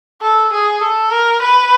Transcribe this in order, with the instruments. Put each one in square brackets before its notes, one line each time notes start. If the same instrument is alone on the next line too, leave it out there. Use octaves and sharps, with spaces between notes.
[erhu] A4
G#4
A4
A#4
B4